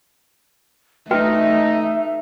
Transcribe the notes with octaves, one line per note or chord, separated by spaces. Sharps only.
A3 D#4 F#4 B4 E5 G5